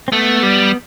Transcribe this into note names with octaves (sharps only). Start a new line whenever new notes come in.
C4
A3 B3
G3